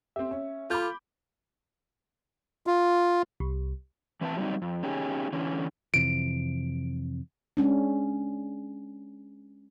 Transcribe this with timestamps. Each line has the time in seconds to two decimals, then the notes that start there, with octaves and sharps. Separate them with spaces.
0.16 C4 G4 E5
0.31 C#4
0.70 F4 A4 B5 D6 G6
2.67 F4
3.40 C2
4.21 E3 C4 B4 C5 E5 A5
4.37 F#3 G3 C4 D#4
4.62 F2
4.83 C#4 D#4 G4 G#4
5.33 D3 E3 C#4
5.94 F2 C3 E3 D7
7.57 G#3 C#4 D4